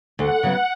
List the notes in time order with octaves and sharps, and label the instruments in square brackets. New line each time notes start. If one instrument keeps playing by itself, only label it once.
[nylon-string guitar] D2 [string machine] F#5
[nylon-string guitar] C#3 F#3 B3